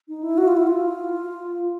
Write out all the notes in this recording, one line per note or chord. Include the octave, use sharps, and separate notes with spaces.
D#4
E4
F#4
F4
E4
F4